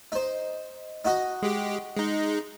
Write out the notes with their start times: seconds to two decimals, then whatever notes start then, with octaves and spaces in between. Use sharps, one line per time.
0.12 D#4 C5
1.05 D#4 F#4 D#5
1.42 G#3 G4
1.97 G#3 D#4